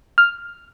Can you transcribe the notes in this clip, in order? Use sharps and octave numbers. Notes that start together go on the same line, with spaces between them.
F6